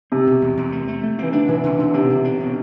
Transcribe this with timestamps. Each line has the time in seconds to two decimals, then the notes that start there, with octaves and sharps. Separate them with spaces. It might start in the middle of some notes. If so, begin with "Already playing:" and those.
0.12 C3 C4
0.27 B2
0.42 E2
0.57 E2
0.72 A3
0.88 A3
1.03 A3
1.19 E3 C4
1.33 D3 D4
1.48 B2 E3
1.63 B2 D3
1.79 B2 D3
1.94 C3 D4
2.10 B2
2.24 D4
2.40 B2